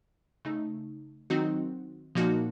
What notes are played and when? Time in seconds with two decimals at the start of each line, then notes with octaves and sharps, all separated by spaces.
0.45 C#3 A3 D#4
1.30 D#3 F#3 C4 D#4 F#4
2.15 A#2 F3 A#3 D#4 F#4